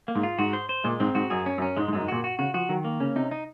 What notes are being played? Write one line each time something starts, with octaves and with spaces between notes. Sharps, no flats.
A#3
G#2
F4
G#2 F#4
C5
C5
A#2 G#3
G#2 C4
G#2 F#4
F#2 G#4
C#4
F#2
C#4
G#2 G#3
G#2
F#2 G#3
G#2
A#2 F#4
F#4
C#3 F#4
F3 F#4
D#3 F#3
A#3
C#3 C#4
C3 D#4
D#4